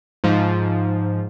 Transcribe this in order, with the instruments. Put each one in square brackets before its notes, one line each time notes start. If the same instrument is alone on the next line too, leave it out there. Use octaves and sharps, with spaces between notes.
[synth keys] G#2 F3